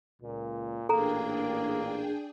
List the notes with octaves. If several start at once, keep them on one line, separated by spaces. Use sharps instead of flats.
C#2 A#2
A1 A#2 A#3 D4 G#4 A4 G5 A#5